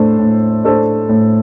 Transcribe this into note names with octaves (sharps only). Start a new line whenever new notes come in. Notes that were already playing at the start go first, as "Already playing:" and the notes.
Already playing: A2 A3 D4 A4 C5
A2
A3 D4 A4 C5
A2